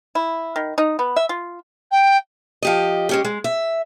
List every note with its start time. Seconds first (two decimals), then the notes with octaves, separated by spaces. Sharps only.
0.15 E4
0.56 D#3
0.78 D#4
0.99 B3
1.16 E5
1.29 F4
1.91 G5
2.62 F3 G4 D#5
3.09 G#3 C#4 G4
3.25 G#3
3.44 E5